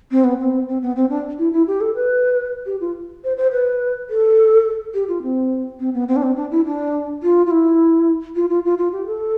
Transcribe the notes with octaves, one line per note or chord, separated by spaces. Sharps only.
C4
B3
C4
C4
B3
C4
D4
E4
E4
G4
A4
B4
G4
F4
C5
C5
B4
A4
G4
F4
C4
C4
B3
C4
D4
C4
D4
E4
D4
F4
F4
E4
F4
F4
F4
F4
G4
A4